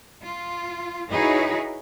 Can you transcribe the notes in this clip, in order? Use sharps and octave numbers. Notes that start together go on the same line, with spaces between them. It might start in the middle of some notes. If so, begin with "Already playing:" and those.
F4
D#4 E4 F#4 G#4 B4 C#5